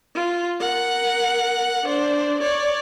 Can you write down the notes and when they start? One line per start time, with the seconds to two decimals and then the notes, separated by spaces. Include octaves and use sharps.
0.15 F4
0.60 A#4 F#5
1.86 D4 C5
2.40 C#5 D5